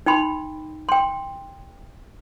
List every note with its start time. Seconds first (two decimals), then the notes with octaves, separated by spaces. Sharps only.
0.06 D#4 G5 B5 C6
0.89 G5 C6